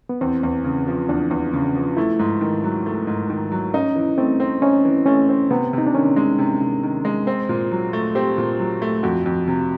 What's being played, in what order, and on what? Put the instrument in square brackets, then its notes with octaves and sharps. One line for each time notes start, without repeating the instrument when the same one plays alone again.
[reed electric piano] B3
[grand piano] E2 [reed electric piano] C4
[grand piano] E2
C#3
F3
[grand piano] E2 [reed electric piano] D4
[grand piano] E2
C#3
F3
[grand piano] A3 [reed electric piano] E4
[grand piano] G#2
D#3
F#3
A3
G#2
D#3
F#3
[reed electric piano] C#4 [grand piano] D#4
[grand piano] E3
[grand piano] A3 [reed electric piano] C4
[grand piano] C4
[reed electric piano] C#4 [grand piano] D#4
[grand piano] E3
[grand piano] A3 [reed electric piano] C#4
[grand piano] C4
[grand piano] C3 [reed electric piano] B3
[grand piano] C3 [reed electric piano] D#4
[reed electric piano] D4
[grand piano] D#3 [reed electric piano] C#4
[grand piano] G#3
C3
C3
D#3
G#3
C4
A#2
F#3
A3
[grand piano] C4 [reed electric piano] G4
[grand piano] A#2
F#3
A3
[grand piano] F2 [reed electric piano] F#4
[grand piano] F2
C3